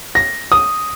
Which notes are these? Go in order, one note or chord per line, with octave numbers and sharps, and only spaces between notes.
A#6
D#6